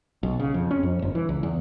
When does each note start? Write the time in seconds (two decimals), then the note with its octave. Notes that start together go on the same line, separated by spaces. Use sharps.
0.23 B1
0.39 C#3
0.54 F2
0.71 C#4
0.83 F2
1.02 G1
1.15 E3
1.29 C#2
1.43 E2